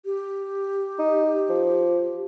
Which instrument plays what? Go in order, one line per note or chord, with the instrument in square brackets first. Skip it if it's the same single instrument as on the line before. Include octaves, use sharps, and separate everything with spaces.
[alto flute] G4
[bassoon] D#4
F3